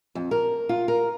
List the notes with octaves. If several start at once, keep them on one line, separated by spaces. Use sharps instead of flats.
F2
A#4
F4
A#4